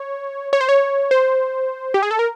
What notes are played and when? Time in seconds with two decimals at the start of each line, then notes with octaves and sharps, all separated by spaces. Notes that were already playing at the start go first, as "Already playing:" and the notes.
Already playing: C#5
0.53 C#5
0.61 C5
0.69 C#5
1.11 C5
1.94 G4
2.03 G#4
2.11 A4
2.19 A#4